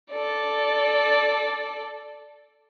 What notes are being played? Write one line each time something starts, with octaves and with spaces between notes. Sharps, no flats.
A4 D5